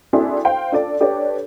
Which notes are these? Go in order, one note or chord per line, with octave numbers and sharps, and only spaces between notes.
C4 D4 E4 F#4 G#4 A4
C5 F5 G5
D4 F4 A4 D5
D4 G4 A4 B4 C#5 D5